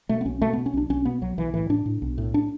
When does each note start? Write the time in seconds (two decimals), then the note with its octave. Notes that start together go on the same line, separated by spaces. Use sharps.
0.09 B2 A3
0.21 B3
0.25 B1 C#4
0.42 B2 A3
0.53 B2 B3
0.66 C#4
0.73 B1 D4
0.90 B1 C#4
1.05 B2 B3
1.21 B1 F#3
1.37 B1 E3
1.54 A2 E3
1.69 A2 D4
1.86 A2
2.02 B1
2.18 A2
2.34 D4